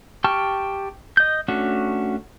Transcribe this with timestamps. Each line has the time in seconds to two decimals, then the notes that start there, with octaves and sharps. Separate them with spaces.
0.24 G4 G5 A5 C#6 F6
1.17 D#5 G6
1.48 A3 C#4 D4 F#4